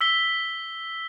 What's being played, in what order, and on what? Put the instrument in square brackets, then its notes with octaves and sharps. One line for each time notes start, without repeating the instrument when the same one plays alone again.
[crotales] E6 B6 G7